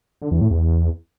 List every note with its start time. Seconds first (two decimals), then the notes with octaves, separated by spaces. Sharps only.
0.22 D3
0.31 E2
0.41 A2
0.51 E2